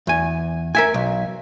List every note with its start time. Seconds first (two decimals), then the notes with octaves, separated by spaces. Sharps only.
0.07 E2 G#5
0.75 A#4 E5 G#5
0.94 B1